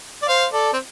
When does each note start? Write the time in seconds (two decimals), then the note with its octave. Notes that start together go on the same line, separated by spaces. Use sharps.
0.22 D5
0.28 C5 F5
0.53 A4 D5
0.73 C4